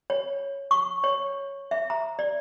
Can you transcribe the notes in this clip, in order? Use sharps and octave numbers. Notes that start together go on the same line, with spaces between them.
C#5
C#6
C#5
E5
A#5
D5